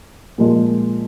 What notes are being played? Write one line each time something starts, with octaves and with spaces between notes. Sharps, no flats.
A#2 F3 G#3